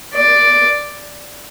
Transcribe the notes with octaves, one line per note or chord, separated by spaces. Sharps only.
D5